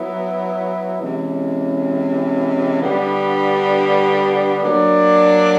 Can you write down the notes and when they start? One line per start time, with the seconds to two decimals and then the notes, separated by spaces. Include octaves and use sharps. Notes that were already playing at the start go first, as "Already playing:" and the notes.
Already playing: F#3 B3 E4
1.00 C3 E3 G#3 C#4
2.81 D3 G3 B3 D4
4.63 F#3 A#3 D4